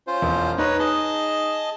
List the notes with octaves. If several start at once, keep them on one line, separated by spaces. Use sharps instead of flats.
C#4 F4 C5
E1
D#4 B4 C#5
G#4 D#5 A5